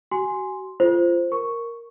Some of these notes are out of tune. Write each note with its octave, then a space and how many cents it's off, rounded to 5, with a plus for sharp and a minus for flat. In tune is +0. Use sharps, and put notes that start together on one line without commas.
F#4 +35 G#5 +0 C6 +0
F4 -20 A4 +0 C5 +0
A#4 +0 C#6 +0